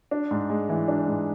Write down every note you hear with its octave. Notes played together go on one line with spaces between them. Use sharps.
D4
G#2
G#3
E3
D4
G#2